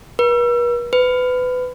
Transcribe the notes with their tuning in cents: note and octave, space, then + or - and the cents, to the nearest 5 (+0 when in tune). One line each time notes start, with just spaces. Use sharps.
B4 -45
B4 +25